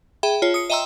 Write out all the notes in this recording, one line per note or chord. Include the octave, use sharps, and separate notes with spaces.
G#4 E5 G5 B5
F4 C#5 A5
D#6 C#7
D#5 E5 G5 A#5 C6 E6